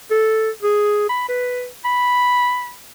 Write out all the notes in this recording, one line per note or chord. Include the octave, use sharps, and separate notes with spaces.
A4
G#4
B5
B4
B5